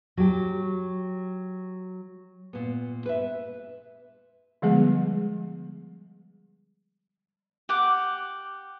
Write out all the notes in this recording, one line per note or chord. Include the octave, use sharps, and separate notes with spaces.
F#3 G4
A#2 B3
B4 E5
D3 F3 G3 G#3 B3 G#4
G4 F#5 D6